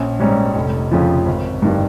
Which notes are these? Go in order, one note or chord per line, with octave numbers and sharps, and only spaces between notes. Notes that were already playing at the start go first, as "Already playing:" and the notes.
Already playing: A#1 C#4
G#2 G3 C#4
F1
F2 C#3 F3
G#1
G2 D#3 G3